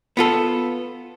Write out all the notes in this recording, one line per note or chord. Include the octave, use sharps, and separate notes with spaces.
B3 F4 A4